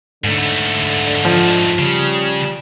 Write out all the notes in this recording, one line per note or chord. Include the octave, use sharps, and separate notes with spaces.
G#2 D3 A3
F3
C#3 G3